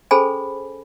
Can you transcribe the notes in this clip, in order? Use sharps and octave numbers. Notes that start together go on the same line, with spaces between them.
C#4 G#4 A4 C5 G#5 B5